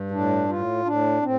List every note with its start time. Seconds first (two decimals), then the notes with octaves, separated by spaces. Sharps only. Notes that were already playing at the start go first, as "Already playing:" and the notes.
Already playing: G2
0.11 A2 D4
0.49 A2 F4
0.85 A2 D4
1.22 A2 C4